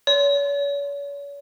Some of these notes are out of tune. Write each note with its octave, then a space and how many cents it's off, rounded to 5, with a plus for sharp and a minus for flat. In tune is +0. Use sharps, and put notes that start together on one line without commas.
C#5 +40